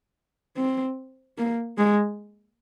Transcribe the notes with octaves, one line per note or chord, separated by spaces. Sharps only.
C4
A#3
G#3